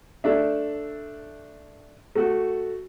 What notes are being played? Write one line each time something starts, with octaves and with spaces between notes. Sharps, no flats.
A3 D4 E5
A3 F#4